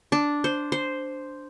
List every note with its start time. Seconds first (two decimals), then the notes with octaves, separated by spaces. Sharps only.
0.12 D4
0.44 C5
0.72 C5